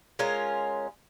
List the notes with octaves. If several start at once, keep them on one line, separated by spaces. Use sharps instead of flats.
G#3 C#4 F4 A#4